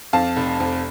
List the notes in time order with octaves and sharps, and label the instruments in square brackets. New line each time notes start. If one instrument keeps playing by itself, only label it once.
[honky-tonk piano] F2 F5 A5
F1
F2